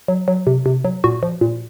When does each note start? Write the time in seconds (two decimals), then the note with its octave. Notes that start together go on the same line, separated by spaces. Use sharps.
0.08 F#3
0.28 F#3
0.47 C3
0.66 C3
0.85 F#3
1.04 A#2 F#4
1.23 F3
1.41 A#2